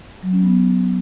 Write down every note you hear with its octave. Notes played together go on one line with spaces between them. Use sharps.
F#3
C#4
B3